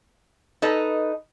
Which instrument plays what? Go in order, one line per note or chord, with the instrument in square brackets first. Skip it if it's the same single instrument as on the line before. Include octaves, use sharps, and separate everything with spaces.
[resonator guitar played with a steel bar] D#4 A4 B4 D#5